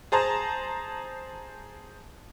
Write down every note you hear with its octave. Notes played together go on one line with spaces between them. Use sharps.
G#4 C5 A5 A#5